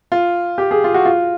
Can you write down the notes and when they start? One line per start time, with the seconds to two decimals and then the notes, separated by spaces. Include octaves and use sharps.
0.12 F4
0.58 G4
0.71 G#4
0.84 F4
0.94 F#4
1.05 F4